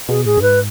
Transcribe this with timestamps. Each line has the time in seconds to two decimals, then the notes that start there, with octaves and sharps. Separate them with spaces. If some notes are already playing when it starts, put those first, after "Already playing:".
0.09 B2 G#4
0.25 A2 G#4
0.37 F#2
0.42 G#2 B4